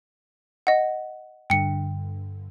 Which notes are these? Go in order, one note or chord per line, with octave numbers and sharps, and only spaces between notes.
D#5 F#5
G2 D3 G5 C#7